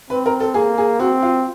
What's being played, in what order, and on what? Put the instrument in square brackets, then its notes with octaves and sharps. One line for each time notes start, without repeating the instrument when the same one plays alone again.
[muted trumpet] C4 [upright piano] B4
[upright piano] A#4
A4
[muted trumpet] A#3 [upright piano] G#4
[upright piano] G#4
[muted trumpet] C4 [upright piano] F#4
[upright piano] F4